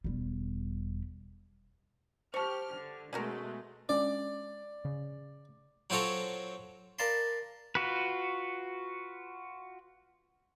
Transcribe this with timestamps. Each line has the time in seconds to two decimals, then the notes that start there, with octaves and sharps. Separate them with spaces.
0.04 E1 G3
2.34 G4 C5 A5 C#6 F6
2.75 D3
3.13 B2 G#3 A3 C#4 F#4 A#4
3.89 G#3 C#4 D4 D5
4.85 C#3
5.90 F#3 C4 F4 A4 C#5 A#5
6.99 A#4 D5 F5 A5 B5 C6
7.75 F4 F#4 B4